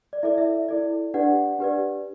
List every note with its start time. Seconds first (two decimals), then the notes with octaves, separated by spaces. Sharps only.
0.13 D5
0.23 E4 A4 D5 E5
0.38 E5
0.68 E4 A4 D5
1.14 D4 G4 B4 D5 F#5
1.59 D4 G4 B4 D5